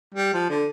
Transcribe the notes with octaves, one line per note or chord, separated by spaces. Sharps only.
G3
F3
D3